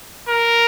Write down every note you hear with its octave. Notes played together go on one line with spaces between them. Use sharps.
A#4